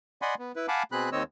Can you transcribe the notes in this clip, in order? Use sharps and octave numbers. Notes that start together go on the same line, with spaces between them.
D5 D#5 F#5 G#5 B5 C6
B3
E4 B4
F5 F#5 G#5 A5 B5 D6
B2 C4 G#4 B5 F#6
D#2 D#3 C4 C#5 D#5 E6